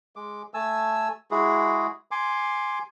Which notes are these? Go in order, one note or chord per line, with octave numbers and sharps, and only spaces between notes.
G#3 D6
A3 G#5 A5 E6
G#3 E4 F#4 G#4
G#5 C6 D6